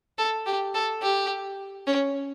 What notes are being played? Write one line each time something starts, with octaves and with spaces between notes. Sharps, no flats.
A4
G4
A4
G4
C#4